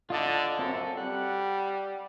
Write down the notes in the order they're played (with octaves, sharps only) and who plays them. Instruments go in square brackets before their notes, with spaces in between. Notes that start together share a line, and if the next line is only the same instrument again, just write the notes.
[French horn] D3 [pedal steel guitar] F4 D#5 A5
[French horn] F#2 [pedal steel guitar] C4 A4
[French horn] G3 [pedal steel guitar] F#5